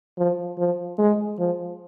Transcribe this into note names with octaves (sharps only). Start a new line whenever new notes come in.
F3
F3
G#3
F3